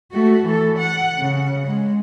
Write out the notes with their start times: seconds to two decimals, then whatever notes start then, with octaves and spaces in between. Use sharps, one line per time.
0.12 A3 F#4
0.46 E3 A4
0.78 F#5
1.18 C#3
1.67 G#3